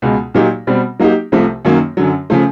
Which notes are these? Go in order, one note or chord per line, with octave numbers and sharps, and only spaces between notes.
C#2 B2 G#3
A#2 F#3 A#3 D#4 G4
B2 G3 C4
F#3 A#3 D#4 G4
C2 C3 F3 A3
F#2 D#3 F#3 A#3
F#2 D3 F#3
C#3 F3 A3